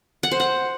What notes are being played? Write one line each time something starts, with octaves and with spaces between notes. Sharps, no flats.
F#5
C5
F#5